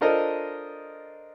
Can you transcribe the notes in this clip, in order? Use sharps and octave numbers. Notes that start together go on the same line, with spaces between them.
D4 F4 A4 A#4 C5 D#5